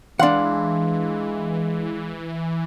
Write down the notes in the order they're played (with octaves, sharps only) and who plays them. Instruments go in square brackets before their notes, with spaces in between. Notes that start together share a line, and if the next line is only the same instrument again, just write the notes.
[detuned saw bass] E3 [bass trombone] G#3 [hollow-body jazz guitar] D4 F#5 [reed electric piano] F5 C6